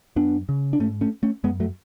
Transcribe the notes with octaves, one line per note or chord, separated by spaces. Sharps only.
F#2 B3 D4
C#3
D4
G#2 A3 C#4
A3 C#4
A3 C#4
F#2 G#3 B3
F#3 A3